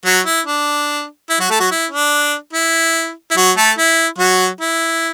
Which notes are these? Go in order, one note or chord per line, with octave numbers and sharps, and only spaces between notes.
F#3 F#4
E4
D4
E4
F#3 F#4
A3 A4
F#3 F#4
E4
D4
E4
E4
F#3 F#4
A3 A4
E4
F#3 F#4
E4